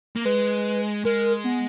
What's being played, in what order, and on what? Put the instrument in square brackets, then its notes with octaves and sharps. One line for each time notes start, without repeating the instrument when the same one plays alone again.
[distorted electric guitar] A#3
[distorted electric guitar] G#3 [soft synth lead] B4
[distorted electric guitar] G#3 [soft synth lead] A#4
[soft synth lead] B3